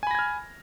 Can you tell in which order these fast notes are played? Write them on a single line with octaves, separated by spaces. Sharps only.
G#5 B5 A#6 G#6 F6